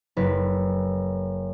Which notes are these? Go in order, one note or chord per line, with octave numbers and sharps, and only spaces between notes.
F#1 B4